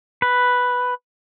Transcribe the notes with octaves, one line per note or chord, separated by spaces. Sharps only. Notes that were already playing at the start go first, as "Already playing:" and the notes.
B4